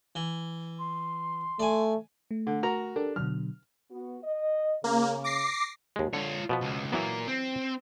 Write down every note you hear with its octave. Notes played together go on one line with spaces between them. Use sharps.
E3
C6
A3 D5 G#5
A3
D3
F#4 A#4 A#5
D4 G4 A4 A#4
B2 D3 F#3 F6
B3 F#4
D#5
C#3 A#3
D6 A#6 C7
D#2 G#3
D3 F4 C#5
B2 F3 B3
C#2
A#2 E3 F#3 A#3 B3
C4